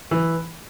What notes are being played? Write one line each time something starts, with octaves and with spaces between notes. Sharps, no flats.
E3